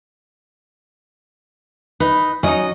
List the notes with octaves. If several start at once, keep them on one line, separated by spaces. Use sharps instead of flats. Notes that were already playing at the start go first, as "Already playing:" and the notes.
D#4 B4
F#3 C#4 D#4 D#5